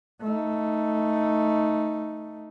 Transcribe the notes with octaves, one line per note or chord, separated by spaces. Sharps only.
A3 D#4